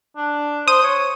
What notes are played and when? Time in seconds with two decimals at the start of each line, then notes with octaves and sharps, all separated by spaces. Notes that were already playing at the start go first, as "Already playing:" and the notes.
0.17 D4
0.68 C5 D#6
0.83 C#5